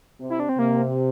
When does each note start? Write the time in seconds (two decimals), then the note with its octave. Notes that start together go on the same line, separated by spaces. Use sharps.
0.21 C3
0.30 E4
0.40 D4
0.49 C4
0.58 C3 A#3